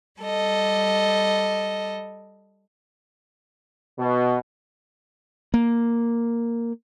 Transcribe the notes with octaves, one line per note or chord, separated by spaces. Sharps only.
G3 A4 D#5
B2
A#3